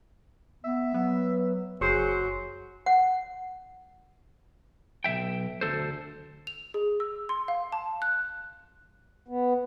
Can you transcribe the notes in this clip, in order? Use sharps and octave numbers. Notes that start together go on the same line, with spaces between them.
B3 E5
F#3 B3
F#1 F#3 G#4 C5
F#5
B1 D#3 E5 G5
D2 C#3 A4 C5
F7
G#4
E6
C6
F5
A5
F#6
B3